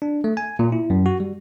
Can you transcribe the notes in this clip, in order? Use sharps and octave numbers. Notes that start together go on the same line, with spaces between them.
D4
A3
G#5
A#2
E4
F#2
F#4
G3